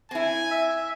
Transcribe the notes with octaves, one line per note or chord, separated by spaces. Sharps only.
C4 E4 G#5
E5